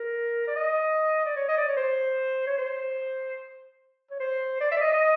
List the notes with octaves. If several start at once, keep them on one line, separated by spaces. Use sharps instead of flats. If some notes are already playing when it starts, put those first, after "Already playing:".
Already playing: A#4
D5
D#5
D5
C#5
D#5
D5
C#5
C5
C#5
C5
C#5
C5
D5
E5
D5
D#5
D#5